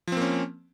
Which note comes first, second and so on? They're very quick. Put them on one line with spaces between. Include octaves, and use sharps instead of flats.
F3 C4 A#3 C#4